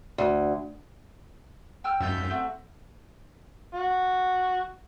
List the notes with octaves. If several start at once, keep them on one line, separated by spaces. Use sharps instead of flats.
D2
G5 E6 F6
F#2 D#4 F4 E5 G6
A3 C4 F#4
F#4